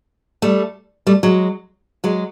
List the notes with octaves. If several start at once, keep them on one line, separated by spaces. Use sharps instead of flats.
G3 A3
G3 A3
F#3 G#3
F#3 G#3